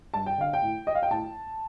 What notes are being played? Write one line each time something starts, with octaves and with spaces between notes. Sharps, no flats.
G2 A5
G5
D3 F5
G5
A2
D#5
F5
G5
A2 A5